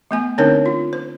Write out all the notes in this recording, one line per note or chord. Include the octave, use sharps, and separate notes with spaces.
A3 B3 G#5
D3 C4 D4 D#4 A#4 C#5
F4
C5